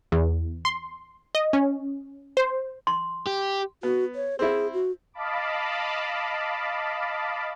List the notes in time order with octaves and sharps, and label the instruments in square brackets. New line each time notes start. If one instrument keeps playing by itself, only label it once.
[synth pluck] E2
C6
D#5
C#4
C5
[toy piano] C6
[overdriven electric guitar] G4
[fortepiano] B3 [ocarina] F#4
[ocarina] C#5
[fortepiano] C4 E4 [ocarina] G#4
[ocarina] F#4
[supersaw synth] D#5 F5 A5 B5 D6